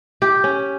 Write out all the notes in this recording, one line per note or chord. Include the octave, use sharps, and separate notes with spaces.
G4
C#4